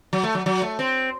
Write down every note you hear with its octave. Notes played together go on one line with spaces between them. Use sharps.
F#3
A3
F#3
F#3
A3
C4